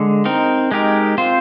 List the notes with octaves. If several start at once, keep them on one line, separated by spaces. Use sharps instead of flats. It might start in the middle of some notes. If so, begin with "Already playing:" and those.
Already playing: D3 G#3
C4 D#4 A#4
G#3 D#4 G4 A#4
C4 F4 C5